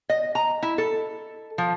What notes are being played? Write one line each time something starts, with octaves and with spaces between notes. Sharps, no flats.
D#5
A#5
E4
A4
F3